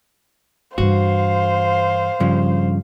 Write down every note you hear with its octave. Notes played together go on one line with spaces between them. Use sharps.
G2 E3 F#4 C5 F5
G2 C#3 F3